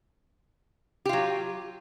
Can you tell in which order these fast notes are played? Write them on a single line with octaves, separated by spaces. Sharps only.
G4 F4 F#3